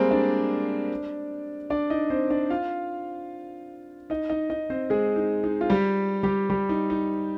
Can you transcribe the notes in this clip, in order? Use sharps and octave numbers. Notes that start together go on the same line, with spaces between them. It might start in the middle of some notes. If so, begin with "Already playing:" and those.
Already playing: G3 G#3 A#3 C4 G4 G#4 A#4 C5
D4 D5
D4 D5
D#4 D#5
C4 C5
D4 D5
F4 F5
D#4 D#5
D#4 D#5
D#4 D#5
C4 C5
G#3 G#4
D#4
D#4
F4
G3 G4
G3 G4
G3 G4
D#4
D#4